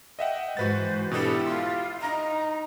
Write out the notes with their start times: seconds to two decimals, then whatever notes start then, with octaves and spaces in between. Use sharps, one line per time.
0.19 D#5 E5 F#5 G5
0.57 G#2 E3 F#4 B4 C5 A6
1.11 B2 B3 D4 E4 G4 A4
1.47 F4 C6
2.01 D#4 A#5